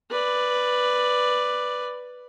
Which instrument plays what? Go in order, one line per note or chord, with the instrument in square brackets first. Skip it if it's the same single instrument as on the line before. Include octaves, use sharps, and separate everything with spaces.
[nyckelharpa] B4 D5